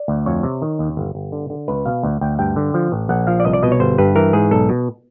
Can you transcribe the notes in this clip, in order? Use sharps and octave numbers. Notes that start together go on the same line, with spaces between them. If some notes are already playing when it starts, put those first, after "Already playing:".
Already playing: D5
D2
F2 C#5
C3
D#3
D#2
G1
G1
D3
D3
C#2 B4
B2 F5
D2
D2 G5
G2 G5
D3
F3
A1
A#1 F#5
F3 F5
D5
C2 D#5
D5
B2 D#5
C#5
G1 C5
G2 B4
E3 A#4
G#2 G#4
B1 A4
B2